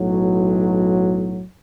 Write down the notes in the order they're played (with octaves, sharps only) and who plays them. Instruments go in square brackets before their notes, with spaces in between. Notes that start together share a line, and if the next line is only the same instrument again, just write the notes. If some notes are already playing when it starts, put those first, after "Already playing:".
Already playing: [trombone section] B1 A2 F#3